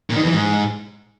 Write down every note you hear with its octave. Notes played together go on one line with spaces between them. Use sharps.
A#2
D#3
E2
E3
G#2